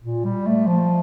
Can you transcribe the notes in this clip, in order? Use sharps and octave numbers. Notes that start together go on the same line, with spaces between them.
A#2
G3
A3
F3